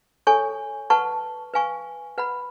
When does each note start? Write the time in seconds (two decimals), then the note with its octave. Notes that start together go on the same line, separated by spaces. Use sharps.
0.27 A4 C#5 G#5 C#6
0.90 B4 F#5 A5 C#6
1.54 B4 F5 G#5 C#6
2.18 B4 F#5 B5